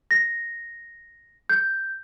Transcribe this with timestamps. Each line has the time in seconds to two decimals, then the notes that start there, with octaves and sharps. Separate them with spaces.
0.11 A#6
1.50 G6